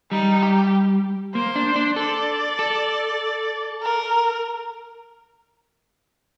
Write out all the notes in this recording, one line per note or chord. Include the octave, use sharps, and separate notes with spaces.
G3 D#4
G4
A#3 C5
D4
D4
A4 D5
A4
A#4